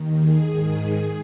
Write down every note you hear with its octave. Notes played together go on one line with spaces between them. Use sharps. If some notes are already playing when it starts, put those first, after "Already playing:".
Already playing: D#2 D#3
G#4
G#2 D#3